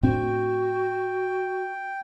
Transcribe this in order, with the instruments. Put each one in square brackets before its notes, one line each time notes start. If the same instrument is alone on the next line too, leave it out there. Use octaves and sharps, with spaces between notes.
[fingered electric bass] A2 C4 D4 [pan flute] F#4 [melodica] G5